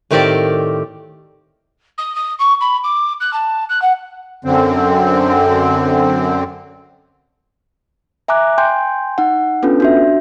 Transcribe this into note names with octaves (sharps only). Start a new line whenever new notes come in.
A2 D#3 C4 G4 A#4 D5
D#6
D#6
C#6
B5
D6
F#6
A5
F#6
F#5
F#2 D3 C4
E5 G#5 A#5 D6 F#6
G5 G#5 C6 G6
D#4 F#5
B3 C#4 D4 F4 A4 B4
D4 F#4 E5